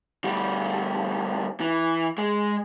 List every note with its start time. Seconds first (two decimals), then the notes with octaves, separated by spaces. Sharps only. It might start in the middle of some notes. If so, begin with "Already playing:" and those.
0.24 D2 G3
1.60 E3
2.18 G#3